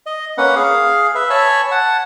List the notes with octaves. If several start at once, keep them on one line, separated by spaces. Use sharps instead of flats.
D#5
A#3 C#4 B4 F#5
G#4 F5
B4 E5
C#5 G#5 A5 B5
F#5 A5